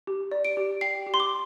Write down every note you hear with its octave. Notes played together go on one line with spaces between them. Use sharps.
G4
D5
D7
G4
G5 C7
G4
C6
D6